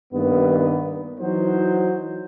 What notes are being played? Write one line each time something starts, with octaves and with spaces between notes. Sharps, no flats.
G2 D#3 A#3 B3
E3 F#3 D#4 F#4 C5